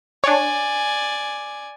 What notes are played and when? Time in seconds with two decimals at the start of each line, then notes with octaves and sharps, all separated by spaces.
0.24 D4 C#5 D5 G#5